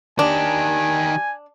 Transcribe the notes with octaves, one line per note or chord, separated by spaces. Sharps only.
D#3 D4 G4 G#5